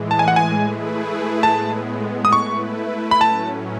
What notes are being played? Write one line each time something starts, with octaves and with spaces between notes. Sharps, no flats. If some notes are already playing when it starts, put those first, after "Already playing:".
Already playing: A2 E3 G#3
A5
G#5
F#5
G#5
A3 E4 G#4 B4
A2 G#3 B3 A5
D#6
A3 E4 B4 C#6
B5
A2 F#3 C#4 A5